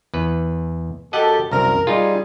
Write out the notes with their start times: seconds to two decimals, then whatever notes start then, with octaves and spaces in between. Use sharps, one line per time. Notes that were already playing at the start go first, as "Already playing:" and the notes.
0.14 E2 B4
1.13 F#2 G4 A4 D#5 F#5
1.52 C2 F#2 A#4
1.87 G3 D#4 F4 G#4